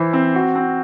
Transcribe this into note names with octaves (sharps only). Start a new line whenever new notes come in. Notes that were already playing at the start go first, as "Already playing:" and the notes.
Already playing: E3 E4 C5
C4
F#4
C4